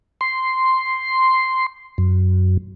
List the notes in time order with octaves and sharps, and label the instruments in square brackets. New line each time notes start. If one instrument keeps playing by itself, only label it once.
[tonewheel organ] C6
F#2